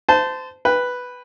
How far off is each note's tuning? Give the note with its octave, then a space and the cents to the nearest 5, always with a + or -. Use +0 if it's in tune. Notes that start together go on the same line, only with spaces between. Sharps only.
C5 -25 A5 +0
B4 +0 G5 +25